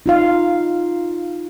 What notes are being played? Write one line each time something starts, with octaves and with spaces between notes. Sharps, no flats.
D#4 F4 F5